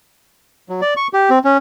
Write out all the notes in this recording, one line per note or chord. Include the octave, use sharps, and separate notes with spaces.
F#3
D5
C#6
G4
C4
C#4